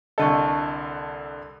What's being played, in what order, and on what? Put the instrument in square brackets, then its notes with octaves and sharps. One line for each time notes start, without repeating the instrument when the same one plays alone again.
[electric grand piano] C2 D3 A4 [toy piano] D#5 A5 C#6